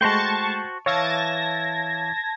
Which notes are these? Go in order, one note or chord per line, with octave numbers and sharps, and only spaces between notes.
G#3 A3 F#4 C5 G5 A5 C#6
E3 C#5 F5 A5 E6 G#6 A#6